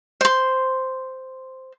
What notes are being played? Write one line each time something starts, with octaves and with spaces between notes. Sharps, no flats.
C5 C6